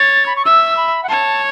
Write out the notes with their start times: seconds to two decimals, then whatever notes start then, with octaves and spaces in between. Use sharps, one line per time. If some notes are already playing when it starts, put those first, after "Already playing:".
Already playing: C#5 A6
0.26 B5
0.36 C#6
0.45 E5 E6
0.77 B5
1.03 F#5
1.09 C#5 A5